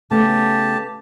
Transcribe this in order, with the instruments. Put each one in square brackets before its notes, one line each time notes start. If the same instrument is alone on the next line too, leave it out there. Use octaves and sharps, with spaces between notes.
[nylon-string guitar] C#3 A3 B3 [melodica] G4 A5